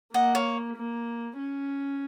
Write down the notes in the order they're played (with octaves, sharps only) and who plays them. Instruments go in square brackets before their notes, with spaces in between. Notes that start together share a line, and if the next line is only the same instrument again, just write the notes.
[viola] A#3 [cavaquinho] D#5 F#5
[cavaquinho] C#5 F5
[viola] A#3
C#4